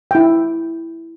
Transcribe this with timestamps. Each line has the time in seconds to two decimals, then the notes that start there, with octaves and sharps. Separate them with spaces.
0.11 E4 G5